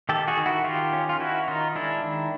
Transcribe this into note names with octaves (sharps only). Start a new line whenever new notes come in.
D#3 G4 A4
F#4 G#4
D#3
E4 F#4
D#3 F4 G4
C#4
F4
D#3 E4 F#4
D#3 D#4 F4
G#3 D4 E4
D#3